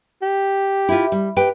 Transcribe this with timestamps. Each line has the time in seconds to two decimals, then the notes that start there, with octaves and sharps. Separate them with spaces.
0.22 G4
0.89 E4 F4
1.12 G3
1.36 G4 B4 G5